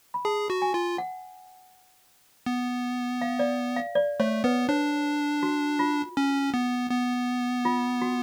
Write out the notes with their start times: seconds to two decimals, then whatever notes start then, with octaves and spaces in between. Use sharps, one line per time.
0.14 B5
0.25 G#4 A5
0.50 F#4
0.62 G#5
0.74 F4
0.98 F#5
2.46 B3
3.22 F5
3.39 D5
3.77 F5
3.95 D5
4.20 A3 C#5
4.44 B3 B4
4.69 D4 C#5
5.43 F#4
5.79 F4
6.17 C#4
6.54 B3
6.91 B3
7.65 F4
8.02 F#4